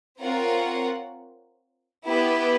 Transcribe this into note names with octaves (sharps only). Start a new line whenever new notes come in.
C4 F4 A#4 C#5 F#5
B3 E4 G4 B4